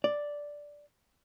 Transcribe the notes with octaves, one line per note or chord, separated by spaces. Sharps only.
D5